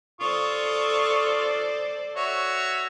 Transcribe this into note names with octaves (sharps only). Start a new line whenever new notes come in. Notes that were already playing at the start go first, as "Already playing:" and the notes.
F4 A4 C5 D5 C#6 D#6
F#4 C#5 E5